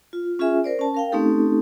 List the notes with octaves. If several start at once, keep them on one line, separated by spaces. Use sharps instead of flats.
F4
C#4 F4 G#4 E5 G#5
A#4 C5 D5
C#4 A5
A#4 F5 G5
A3 C4 C#4 D#4 G4 A4